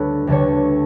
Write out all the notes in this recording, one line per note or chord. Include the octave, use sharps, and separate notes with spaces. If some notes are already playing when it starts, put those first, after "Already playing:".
Already playing: D2 D3 G3 G4 A4 B4 C#5
D2 D3 G3 A4 C#5